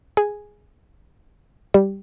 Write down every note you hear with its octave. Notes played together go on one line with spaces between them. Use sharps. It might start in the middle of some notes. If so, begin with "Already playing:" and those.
G#4
G3